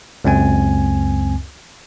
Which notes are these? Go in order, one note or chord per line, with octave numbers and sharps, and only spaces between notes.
C#2 F#2 C4 G#5